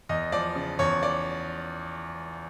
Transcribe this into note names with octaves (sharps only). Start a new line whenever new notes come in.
E2 D#5
F3 D5
C#3
E2 C#5
D5